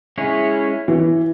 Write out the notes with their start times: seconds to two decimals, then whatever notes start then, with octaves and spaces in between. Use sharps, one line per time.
0.18 G#3 C#4 E4 G#4 C#5
0.88 E3